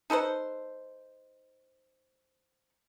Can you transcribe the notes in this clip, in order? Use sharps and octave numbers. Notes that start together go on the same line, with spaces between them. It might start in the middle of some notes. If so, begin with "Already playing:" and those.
D#4 A4 B4 C5